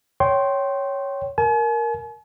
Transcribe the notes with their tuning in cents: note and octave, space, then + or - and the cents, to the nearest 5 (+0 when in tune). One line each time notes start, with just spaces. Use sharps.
C#5 +0 G5 -20 C6 +10
A#4 +0 G#5 +45